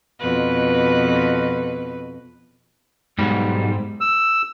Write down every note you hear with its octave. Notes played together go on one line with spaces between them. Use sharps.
F2 B2 B4
B1 G#2 G3
E6